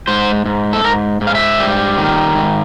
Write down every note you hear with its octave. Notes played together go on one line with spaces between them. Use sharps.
G#2 C5
G#2
A4
G#2 A#4
G#2
F5
E5
G3
D#3
G#2